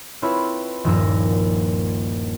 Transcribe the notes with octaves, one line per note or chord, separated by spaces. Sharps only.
C4 E4 F4 A4 B4 C#5
D#1 G2 F3 A#3 A#4 E6